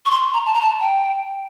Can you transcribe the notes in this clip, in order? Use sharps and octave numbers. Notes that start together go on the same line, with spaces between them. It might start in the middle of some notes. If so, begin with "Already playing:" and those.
C#6
C6
A#5
A5
A#5
A5
G5